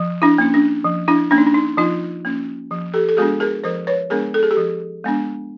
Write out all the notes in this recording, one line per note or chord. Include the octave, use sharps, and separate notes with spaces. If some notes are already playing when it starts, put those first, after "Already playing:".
Already playing: F3
D4 E4
A#3 C#4
D4
F3
D4 E4
A#3 C#4 D4
D#4
D4
D#4
F3 D#4 F4
A#3 C#4
F3
G4 A4
A4
G#3 B3 D4 F#4 G#4
G#4 A#4
F3 A#4 C5
B4 C#5
G#3 B3 D4 G#4 A#4
A4
G#4
G4 A4
F3
G#3 B3 D4